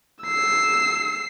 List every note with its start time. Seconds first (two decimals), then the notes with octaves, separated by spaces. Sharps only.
0.24 E6 C7